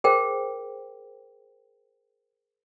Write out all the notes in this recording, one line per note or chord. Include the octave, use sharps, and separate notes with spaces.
G#4 A#4 C5 G5